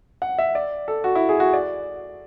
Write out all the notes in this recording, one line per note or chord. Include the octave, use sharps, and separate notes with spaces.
F#5
E5
D5
A4
F#4
E4
G#4
F#4
D5